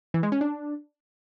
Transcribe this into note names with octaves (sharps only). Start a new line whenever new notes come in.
E3
G#3
C#4
D4